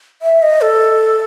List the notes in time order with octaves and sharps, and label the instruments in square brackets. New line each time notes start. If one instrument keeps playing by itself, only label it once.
[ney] E5
D#5
A4